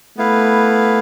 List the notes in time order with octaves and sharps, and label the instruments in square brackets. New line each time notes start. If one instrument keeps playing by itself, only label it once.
[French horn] A3 [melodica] B3 E4 B4 F5